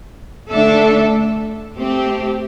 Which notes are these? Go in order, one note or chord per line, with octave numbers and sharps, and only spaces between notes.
D3 A3 D4 A4 E5
A3 C4 G4